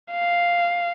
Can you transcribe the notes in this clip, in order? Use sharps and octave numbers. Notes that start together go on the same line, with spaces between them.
F5